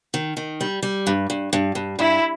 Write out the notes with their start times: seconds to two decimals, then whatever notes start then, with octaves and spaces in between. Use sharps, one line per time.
0.14 D#3
0.37 D#3
0.61 G3
0.83 G3
1.07 G2
1.30 G2
1.53 G2
1.75 G2
1.99 G2 E4